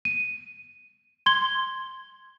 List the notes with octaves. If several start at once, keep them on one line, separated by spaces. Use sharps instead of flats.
D#7
C6 G#6 G7